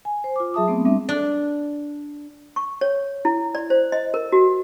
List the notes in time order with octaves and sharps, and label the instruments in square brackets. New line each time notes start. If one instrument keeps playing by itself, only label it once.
[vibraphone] G#5
C5
F4 D6
F#3 G#4 E5 A5 D#6
A3 B3 C4
G3 C4 D4 E5
[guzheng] D4
[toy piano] C#6
C#5
E4
D5
C5
D#5
A#4
F#4